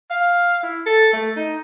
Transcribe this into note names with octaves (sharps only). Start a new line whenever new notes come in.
F5
E4
A4
A3
D#4